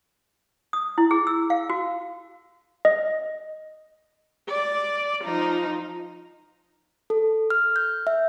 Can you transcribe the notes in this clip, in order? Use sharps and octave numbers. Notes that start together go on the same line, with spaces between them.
D#6
E4
G#4
E6
F5
F#4
D#5
D5
F3 D#4
A4
F6
G6
E5